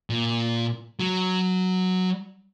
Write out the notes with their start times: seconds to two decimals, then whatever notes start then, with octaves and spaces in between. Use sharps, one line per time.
0.10 A#2
1.00 F#3